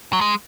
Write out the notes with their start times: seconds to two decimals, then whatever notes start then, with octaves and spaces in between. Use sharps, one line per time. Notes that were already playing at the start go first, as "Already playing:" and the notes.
0.13 F#3
0.21 G#3